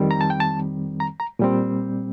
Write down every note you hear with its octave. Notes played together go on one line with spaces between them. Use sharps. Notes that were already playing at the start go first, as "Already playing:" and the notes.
Already playing: F2 D#3 G3 C4
A#5
A5
G5
A5
A#5
A#5
A#2 G3 C4